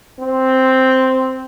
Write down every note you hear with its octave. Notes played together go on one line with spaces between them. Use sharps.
C4